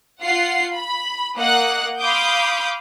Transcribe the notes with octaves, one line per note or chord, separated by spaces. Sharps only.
F4 F#5 C7
B5
A#3 D#5 F#5 F#6
F5 B5 C6 D6 D#6 G6